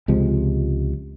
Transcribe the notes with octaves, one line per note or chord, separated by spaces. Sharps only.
C#2 C3 F3 G#3